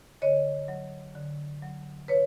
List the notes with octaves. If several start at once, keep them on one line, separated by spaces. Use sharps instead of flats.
D3 C#5 D#5
F#3
D3
F#3
C3 B4 C#5